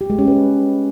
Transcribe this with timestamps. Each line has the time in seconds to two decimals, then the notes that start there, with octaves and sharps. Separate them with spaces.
0.01 G4
0.10 G#3
0.19 C#4
0.28 B4